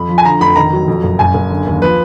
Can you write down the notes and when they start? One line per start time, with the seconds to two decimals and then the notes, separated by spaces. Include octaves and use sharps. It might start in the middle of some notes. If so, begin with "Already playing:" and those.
Already playing: F2 B5
0.09 F3
0.18 G#5
0.25 D3 A#5
0.41 F1 B5
0.56 D#3 A#5
0.72 F#3
0.88 F2
1.03 F#1
1.19 F#1 G#5
1.34 F#1
1.50 D3
1.67 D#2
1.81 F3 B4